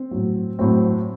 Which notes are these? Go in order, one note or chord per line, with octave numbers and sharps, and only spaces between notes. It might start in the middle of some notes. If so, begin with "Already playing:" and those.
Already playing: C4
A2 F#3
A2 F#3 C4